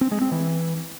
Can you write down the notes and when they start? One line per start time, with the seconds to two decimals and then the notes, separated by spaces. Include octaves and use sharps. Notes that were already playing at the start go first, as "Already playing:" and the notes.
0.01 C4
0.11 G#3
0.21 C4
0.31 E3